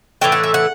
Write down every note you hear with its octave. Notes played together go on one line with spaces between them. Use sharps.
A2 E3 A3 D4 G5
F#5
E5
F#5